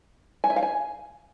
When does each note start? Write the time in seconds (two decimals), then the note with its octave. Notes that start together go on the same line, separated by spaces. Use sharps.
0.44 G#5
0.50 E5
0.56 F5
0.63 G#5